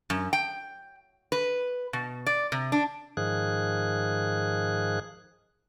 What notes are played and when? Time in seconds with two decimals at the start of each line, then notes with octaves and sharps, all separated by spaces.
0.10 F#2
0.33 G5
1.32 B4
1.93 B2
2.26 D5
2.52 C3
2.72 D4
3.17 G#2 D#3 F3 G#4 F#6